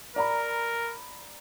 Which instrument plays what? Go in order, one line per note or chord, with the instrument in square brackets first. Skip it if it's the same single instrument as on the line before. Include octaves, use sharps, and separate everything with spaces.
[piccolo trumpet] A#4 [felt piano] D5 A#5 B5